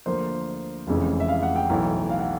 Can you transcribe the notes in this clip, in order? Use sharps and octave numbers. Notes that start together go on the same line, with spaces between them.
D2 D3 F3 A#3 C5
F1 F2 C#3 E3 G#3
E5
F5
F#5
G5
B1 A2 E3 A3
F5
F#5